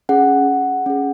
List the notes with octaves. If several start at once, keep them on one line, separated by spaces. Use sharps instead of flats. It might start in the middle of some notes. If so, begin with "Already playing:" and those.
C#4 G#4 F#5
C#4 G#4